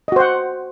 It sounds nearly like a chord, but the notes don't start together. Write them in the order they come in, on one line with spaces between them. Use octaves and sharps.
D#5 F#4 C5 F#5